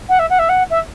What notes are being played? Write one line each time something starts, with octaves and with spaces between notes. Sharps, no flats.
F#5
E5
F#5
E5
F#5
E5